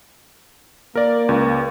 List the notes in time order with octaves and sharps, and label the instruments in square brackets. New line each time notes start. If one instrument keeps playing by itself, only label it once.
[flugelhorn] A#3 [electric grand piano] A#4 D5
[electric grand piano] C#2